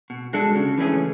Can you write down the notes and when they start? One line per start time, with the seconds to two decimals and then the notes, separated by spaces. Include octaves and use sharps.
0.10 B2
0.33 G#3 D4 F#4 A4
0.55 C#3
0.78 E3 A3 C#4 G#4